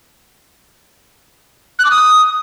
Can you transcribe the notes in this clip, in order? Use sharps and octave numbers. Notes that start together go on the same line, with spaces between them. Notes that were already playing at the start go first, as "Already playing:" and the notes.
F#6
D6
D#6